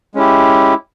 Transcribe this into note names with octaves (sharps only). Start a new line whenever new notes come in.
G#3 C#4 E4 G4